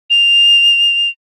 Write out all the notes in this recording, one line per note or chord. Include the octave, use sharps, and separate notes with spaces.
F7